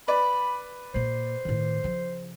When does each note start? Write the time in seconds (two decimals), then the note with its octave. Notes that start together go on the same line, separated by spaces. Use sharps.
0.08 B4 D5 B5
0.94 A#2 A#3 C5
1.45 A2 D#3
1.84 C#3 F3